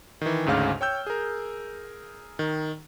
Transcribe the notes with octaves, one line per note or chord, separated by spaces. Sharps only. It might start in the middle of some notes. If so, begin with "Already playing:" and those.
D#3 E3
G#1 D2 G#2 C#3 F5 F6
C#5 G5 E6 G6
G#4 A#4
D#3